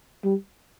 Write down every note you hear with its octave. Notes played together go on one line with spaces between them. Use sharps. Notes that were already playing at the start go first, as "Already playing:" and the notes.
G3